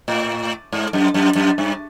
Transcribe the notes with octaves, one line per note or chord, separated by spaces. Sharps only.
A2
G#2
F#2
F#2
F#2
G2